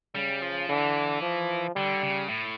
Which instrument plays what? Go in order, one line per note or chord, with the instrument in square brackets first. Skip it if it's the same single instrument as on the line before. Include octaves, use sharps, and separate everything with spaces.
[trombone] C#3 [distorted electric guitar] G3
[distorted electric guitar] F3
[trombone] D3 [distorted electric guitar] E3
[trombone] F3
[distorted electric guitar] D3 [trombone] G3
[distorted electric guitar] C#3
A2